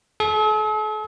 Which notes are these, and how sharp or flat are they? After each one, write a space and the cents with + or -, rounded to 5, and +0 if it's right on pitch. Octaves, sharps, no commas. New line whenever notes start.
A4 -45